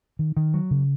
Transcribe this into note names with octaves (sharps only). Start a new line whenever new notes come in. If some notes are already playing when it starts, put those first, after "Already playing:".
D#3
D#3
F#3
C#3